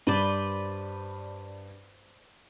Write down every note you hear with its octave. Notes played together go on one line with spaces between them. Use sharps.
G2 B4 C5 D5